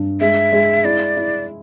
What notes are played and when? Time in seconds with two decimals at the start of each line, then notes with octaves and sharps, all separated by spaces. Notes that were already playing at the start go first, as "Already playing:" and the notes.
Already playing: G2
0.20 G#3 E5
0.52 G#3
0.85 E4 D5
1.17 E4